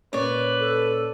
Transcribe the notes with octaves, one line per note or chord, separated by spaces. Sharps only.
A#2 A#3 C#4 B4 C#5 D5
A4